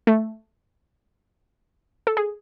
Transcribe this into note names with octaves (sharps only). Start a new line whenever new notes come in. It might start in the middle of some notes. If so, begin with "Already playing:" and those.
A3
A4
G#4